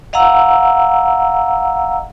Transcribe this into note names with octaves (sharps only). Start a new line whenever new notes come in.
D#5 F5 F#5 A#5 E6